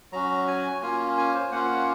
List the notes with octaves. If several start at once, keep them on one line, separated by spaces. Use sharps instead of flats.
F#3 C#4 F#4 A#5
G#5
A#3 C#4 F4 G#5
G#5
C5
A#3 C#4 F4 F#5